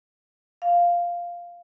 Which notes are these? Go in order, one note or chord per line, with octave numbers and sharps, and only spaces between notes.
F5